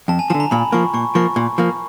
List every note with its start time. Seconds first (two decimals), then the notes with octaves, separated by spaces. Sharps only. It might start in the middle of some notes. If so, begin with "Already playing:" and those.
0.08 F2 A5
0.19 G#5
0.30 F3 A5
0.34 D3
0.40 A#5
0.51 A#2 B5
0.72 F3 A#3 C#6
0.94 A#2 C#6
1.15 F3 A#3 C#6
1.36 A#2
1.58 F3 A#3